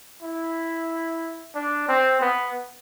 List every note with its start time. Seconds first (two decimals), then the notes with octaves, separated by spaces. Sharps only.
0.22 E4
1.55 D4
1.88 C4
2.21 B3